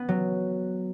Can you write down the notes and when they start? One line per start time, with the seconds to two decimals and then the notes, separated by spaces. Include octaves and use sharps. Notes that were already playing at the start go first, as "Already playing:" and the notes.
Already playing: B3
0.09 F#3